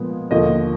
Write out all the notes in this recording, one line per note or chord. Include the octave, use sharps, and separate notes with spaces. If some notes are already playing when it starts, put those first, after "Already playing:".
Already playing: A#2 F3 G#3 B3
D#2 D3 F3 A#3 D#5